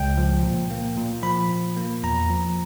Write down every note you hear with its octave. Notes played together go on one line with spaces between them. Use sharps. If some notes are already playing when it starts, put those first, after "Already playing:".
Already playing: C#2 G5
F3
A#2
A#3
A#2
F3 B5
A#2
A#3
E2 A#5
F3